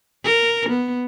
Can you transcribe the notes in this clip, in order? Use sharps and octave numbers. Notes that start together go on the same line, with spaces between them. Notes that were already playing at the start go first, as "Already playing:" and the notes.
A#4
B3